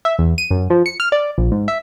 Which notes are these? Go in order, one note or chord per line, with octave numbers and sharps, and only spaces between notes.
E5
E2
D#7
F#2
F3
C#7
F6
D5
A#1
G#2
E5